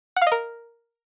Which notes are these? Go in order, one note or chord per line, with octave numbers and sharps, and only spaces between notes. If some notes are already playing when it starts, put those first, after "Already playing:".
F#5
F5
D#5
A#4